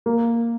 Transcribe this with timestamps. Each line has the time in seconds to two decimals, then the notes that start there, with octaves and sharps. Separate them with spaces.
0.06 A#3